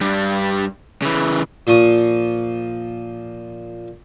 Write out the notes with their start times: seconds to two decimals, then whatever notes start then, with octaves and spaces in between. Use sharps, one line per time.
0.01 G2 G3
1.02 C#3 E3
1.67 A#2 F3 C#6 D#6